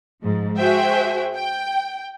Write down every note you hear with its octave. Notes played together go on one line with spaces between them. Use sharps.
G#2 F3
F#4 G#4 C5 E5 G5
G5